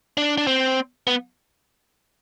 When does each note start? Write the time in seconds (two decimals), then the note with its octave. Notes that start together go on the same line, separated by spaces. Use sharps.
0.17 D4
0.38 D4
0.47 C4
1.07 B3